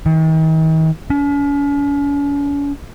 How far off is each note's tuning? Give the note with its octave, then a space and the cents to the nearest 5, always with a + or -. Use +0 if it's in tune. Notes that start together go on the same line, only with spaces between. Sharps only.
D#3 +45
C#4 +45